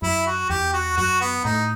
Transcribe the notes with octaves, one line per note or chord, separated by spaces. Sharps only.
F#2 E4
F#4
E2 G4
F#4
F#2 F#4
B3
A2 D#4